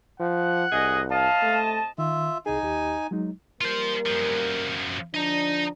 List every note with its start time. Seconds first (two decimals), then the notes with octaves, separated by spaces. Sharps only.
0.20 F3 F#5
0.72 C2 G#4 D#5
1.11 C3 D#5 F5 A5
1.42 A3
1.98 D#3 F4 E5
2.46 C2 D#4 G#4 G#5
2.63 D#2 G4
3.11 F#3 G#3 D#4
3.61 G3 A#3 F4 A#4 C5
4.06 F#2 F3
5.14 D3 F3 D4 D#5 A#5